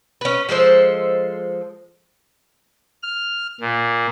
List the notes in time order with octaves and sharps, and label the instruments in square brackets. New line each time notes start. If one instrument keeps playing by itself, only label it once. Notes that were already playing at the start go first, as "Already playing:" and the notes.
[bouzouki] C#4 B4
F3 G#3 A4 C5
[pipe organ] F6
A#2